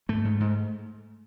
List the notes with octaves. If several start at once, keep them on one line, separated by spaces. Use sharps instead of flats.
G#2 A3
G#2
G#2